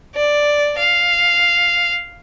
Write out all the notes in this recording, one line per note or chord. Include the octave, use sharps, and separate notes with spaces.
D5
F5